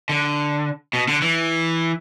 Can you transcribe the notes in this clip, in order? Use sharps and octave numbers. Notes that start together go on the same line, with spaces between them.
D3
B2
D3
E3